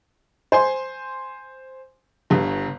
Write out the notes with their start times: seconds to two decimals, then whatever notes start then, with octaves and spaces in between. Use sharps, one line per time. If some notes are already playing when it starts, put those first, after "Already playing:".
0.52 C5 G#5 C6
2.30 G1 G2